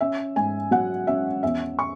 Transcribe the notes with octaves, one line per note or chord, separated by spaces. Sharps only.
C#4 E5
G#2 G#5
F#3 F#5
C#4 E5
E2 E5
C#6